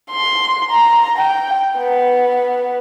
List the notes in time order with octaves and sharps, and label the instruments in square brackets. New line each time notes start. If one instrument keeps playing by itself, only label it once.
[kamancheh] C6
A#5
G5
B3